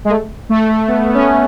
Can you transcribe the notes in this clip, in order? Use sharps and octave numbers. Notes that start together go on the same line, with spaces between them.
G#3
A3
A3
A3
B3
B3
C#4